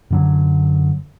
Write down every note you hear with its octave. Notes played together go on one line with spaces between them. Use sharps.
F#2 D3 F#3